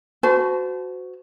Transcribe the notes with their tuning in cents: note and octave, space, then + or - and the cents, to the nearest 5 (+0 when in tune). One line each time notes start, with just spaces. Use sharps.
F#4 +0 C5 -40 A5 -20